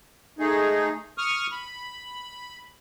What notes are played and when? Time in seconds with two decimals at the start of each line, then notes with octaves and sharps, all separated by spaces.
0.39 A3 D#4 G#4
1.18 C#6 D#6 F6
1.51 B5